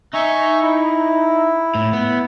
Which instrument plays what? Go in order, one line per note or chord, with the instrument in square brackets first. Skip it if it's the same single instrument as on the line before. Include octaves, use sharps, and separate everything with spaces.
[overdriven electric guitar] D#4 [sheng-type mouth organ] E5 G#5 C#6
[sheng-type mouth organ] E4
[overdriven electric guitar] A2
B3